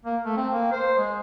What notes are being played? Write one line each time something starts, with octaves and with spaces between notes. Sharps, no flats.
A#3
A3
C4
A#3
C5
G#3